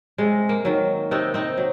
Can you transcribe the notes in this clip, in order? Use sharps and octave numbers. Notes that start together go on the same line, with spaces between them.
C3 G#3
A#3
D#3 F#3
C3 C4 D#4
C4 D#4
F#3